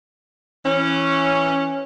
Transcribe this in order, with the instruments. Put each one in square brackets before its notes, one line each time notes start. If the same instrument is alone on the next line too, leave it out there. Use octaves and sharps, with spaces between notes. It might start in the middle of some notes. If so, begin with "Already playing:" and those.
[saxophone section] E3 C#4